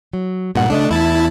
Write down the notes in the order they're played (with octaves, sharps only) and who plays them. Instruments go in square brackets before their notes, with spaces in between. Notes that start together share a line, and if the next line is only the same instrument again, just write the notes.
[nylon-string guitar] F#3
[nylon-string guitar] G2 F#5 [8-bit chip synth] A#2
[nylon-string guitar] C#3 A3 D#5 [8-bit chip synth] D4
[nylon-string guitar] E2 [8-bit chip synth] E4 A5